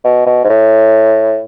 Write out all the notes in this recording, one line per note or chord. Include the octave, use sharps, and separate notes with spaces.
B2
B2
G#2
A2